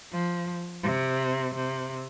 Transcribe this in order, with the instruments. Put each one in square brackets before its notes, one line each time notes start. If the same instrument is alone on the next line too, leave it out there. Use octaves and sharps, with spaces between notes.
[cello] F3
C3
C3